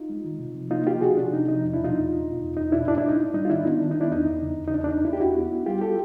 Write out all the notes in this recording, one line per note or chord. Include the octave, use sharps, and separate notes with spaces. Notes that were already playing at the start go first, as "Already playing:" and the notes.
Already playing: D#4 F4
G#3
D#3
C3
F3
A#3 D#4 F4
F3 F4 G4
C3 F#4 G#4
C3 D4
C3 D#4
F3 D#4
E2
D4 E4
B2 D#4 F4
E2
B2
B2
E2
E2 D#4
B2 D4 E4
G#2 D4 E4
G#2 D4 E4
D#4
G#2 D4
G3 D#4
F4
D#3 D4 E4
B3 D#4
D#3 D4
B3 D#4
D4 E4
E2 D#4
E2
C#3
E2
D#4
E2 D4
D4
E2 D#4
E2 D4 E4
G4
E2 E4 F#4
B3
B3
G3 F4 G4
G4 A4